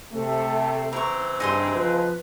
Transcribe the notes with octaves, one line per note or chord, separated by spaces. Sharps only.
C3 A3 A4
C#3 E3 C4 A#5 C#6
G2 D#4 G#4 G#5 C6
F3 B4